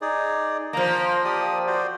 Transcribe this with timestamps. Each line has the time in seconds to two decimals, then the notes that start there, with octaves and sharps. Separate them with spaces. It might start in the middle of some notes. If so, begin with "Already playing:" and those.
0.01 D#4 G#4 D5
0.73 F3 A#3 A#5
1.25 G4 D5 D#6
1.67 F#4 C5 D5